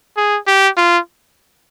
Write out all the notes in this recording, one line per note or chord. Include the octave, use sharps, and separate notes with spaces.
G#4
G4
F4